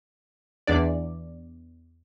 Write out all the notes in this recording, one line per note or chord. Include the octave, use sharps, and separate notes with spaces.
E2 D4 D5